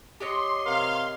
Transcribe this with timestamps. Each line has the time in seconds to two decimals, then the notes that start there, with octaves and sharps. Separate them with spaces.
0.20 G4 C#5 D#5 C6
0.67 C3 A#4 F5